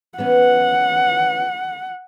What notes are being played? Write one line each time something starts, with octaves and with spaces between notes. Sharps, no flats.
E3 B3 C#4 F#5